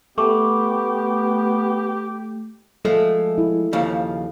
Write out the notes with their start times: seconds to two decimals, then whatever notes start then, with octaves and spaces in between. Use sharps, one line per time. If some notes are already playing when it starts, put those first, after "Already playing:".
0.18 A3 B3 G4 C#6 D6
2.85 F3 G#3 A3 A4
3.38 E4
3.73 D#2 C#3 F3